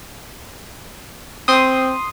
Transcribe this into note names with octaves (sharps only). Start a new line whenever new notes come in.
C4 C6 D#6